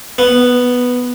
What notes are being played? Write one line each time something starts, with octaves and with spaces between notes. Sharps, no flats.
B3